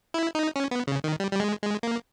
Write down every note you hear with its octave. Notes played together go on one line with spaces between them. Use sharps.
E4
D#4
C#4
B3
C#3
D#3
G3
G3
G#3
G#3
A#3